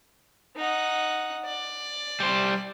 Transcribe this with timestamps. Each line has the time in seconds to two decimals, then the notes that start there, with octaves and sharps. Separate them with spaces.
0.57 D#4 F#5
1.45 D5
2.20 G3 C5